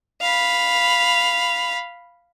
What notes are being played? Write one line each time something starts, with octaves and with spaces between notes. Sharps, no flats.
F5 B5